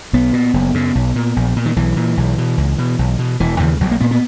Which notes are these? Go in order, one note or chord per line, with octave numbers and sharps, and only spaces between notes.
B1 B3
A#2
F#1
F#2 C#3
B1
A#2
A#1
A#2
D#3
B1 E3
A#2
B1
B2
C#2
B2
B1
B2
E1 E3
D#2 C#3 E3
B1 F#3
A#3
A#2 B3
B3